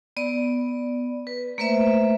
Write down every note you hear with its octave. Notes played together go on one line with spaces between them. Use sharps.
B3 D5
B4
A3 A#3 B4 C5 E5